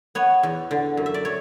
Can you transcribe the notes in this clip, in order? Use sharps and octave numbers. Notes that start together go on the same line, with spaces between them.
B3 C#5
E2
D3
F#2
E5
D5
C#5